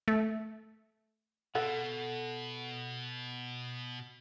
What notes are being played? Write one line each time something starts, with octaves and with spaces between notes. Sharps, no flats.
A3
B2 A4 F#5